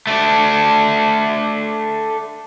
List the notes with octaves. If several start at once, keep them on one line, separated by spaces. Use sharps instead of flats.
A3 D4